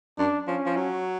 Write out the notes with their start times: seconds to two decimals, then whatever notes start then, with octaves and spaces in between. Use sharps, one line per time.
0.18 F#2 D4
0.48 F3 C#4
0.66 F3
0.77 F#3